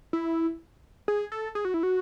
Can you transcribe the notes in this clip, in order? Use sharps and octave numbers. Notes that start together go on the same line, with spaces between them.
E4
G#4
A4
G#4
F#4
E4
F#4